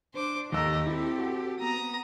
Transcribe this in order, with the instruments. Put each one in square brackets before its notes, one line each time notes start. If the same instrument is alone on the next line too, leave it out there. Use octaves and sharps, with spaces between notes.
[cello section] D4 [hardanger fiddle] C5 D6
[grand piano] D#2 E6 [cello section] G4 A4 [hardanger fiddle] D#5 A#5
[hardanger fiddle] C4 [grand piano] E4
[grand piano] F#4
[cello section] B3 [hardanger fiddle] A#5 D#6